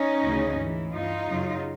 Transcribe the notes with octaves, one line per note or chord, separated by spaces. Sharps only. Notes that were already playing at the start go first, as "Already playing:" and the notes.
Already playing: C#4 D#4
D2 C#3 E3
G#2 E3
G2 E3 D#4 F4
F#2 C#3 F#3